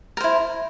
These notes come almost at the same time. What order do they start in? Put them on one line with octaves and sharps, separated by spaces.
A#4 C5 E4